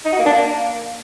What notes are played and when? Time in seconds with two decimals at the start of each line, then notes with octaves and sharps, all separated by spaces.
0.05 D#4
0.12 F#4
0.19 A#3
0.26 D4
0.33 A#3